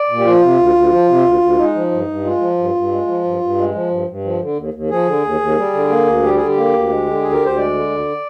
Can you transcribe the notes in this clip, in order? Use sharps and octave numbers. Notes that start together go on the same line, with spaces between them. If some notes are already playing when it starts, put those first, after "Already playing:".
Already playing: D5
A#2
G4
F3 F4
C3
D2
D2
F3
C3
D2
D2
G#3 D#4
F3
G2
G2
G#3 F4
F3
G2
G2
G#3
F3
G2
G2
G#3
F3
G2
G2
F3
D3
D#2
D#2
F3 G#4
D3
D#2
D#2
G3
D3
A#3
D2
G3 G4
D3 G#4
G4
A#3
D2
G#3
D3
D2 G#4
A#4
D2
C5
G#3 D5
D3
D2